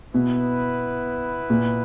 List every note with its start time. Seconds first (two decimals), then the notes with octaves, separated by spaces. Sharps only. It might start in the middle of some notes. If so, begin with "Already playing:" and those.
0.14 B2 B3 E4 B4
1.50 A#2